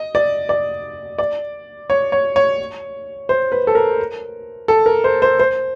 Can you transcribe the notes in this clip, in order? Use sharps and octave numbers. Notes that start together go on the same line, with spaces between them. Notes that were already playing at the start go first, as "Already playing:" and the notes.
Already playing: D#5
D5
D5
D5
C#5
C#5
C#5
C5
B4
A4
A#4
A4
A#4
C5
C5
C5